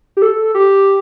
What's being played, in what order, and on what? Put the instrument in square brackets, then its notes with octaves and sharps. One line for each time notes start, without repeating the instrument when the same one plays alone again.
[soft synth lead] G4
A4
G4